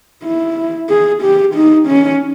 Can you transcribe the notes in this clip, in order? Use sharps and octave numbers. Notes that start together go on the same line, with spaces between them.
E4
G#4
G4
D#4
C#4